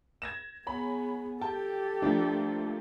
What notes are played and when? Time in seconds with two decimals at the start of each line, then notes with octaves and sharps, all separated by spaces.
0.22 G#6 A#6 E7
0.67 B3 G#4 C#5 A#5 B5
1.41 G4 A4 G5 A5
2.02 F3 A3 A#3 D4